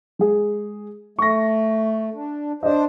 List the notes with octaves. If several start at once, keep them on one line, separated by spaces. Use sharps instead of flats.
G#3 G#4
A3 C#6 A#6
D4
D4 C5 D5 D#5